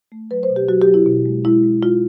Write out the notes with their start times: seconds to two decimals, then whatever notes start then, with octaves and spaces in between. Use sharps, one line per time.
0.12 A3
0.31 F#3 B4
0.43 C5
0.50 B2
0.56 G4
0.69 F#3 F#4
0.82 G4
0.88 F#3
0.94 E4
1.07 B2
1.26 G#3
1.45 G#3 E4
1.64 G#3
1.83 G#3 F4